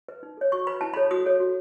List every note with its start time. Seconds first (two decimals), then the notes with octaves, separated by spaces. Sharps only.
0.08 B4
0.23 D#4
0.37 A4 C#5
0.52 F#4 C#6
0.67 B4 B5
0.81 E4 A5
0.94 A4 C#5 B5
1.11 F#4 D#6
1.26 A4 C#5
1.40 F#4